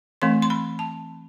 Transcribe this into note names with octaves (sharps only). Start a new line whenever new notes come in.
E3 A3 C4 C6
C6
B5
A5